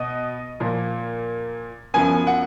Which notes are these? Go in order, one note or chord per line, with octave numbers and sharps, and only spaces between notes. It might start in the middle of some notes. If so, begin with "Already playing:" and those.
Already playing: B2 B3 D#5
A#2 F3 A#3
F#2 F3 B3 G#5
F#5